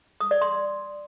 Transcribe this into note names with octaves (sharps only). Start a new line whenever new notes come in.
D#6
D5
C6